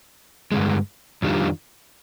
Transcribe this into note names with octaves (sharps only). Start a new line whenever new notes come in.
G2 D3 G#3
F2 D#3 G3 D4 F4